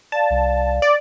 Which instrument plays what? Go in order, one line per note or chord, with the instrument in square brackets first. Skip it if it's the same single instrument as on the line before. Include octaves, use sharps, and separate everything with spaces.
[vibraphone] D5 F5 [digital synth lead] A5
[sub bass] C2
[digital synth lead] D5